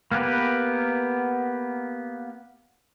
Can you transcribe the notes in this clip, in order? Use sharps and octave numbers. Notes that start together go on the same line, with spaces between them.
A#3 B3 G4 B4